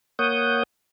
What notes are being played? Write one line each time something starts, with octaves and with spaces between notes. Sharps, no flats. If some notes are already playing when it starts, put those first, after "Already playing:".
A#3 C#5 F#5 D#6 G6